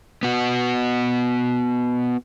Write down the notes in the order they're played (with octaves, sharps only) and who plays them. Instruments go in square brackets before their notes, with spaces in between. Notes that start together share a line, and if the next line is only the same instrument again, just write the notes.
[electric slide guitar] B3 F#4